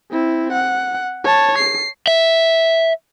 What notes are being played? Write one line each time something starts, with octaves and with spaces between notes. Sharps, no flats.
C4 E4
F#5
C#5 A5
C7
E5